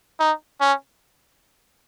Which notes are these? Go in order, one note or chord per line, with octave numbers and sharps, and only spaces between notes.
D#4
C#4